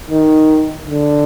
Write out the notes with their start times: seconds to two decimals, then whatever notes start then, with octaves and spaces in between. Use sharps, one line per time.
0.11 D#3
0.88 D3